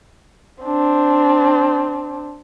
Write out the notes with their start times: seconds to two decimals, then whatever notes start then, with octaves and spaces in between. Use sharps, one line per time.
0.63 C4 D4